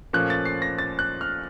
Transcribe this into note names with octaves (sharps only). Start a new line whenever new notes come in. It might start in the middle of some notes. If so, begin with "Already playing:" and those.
A#2 F3 A3 C#4 F#6
A6
C7
A#6
A6
F#6
F6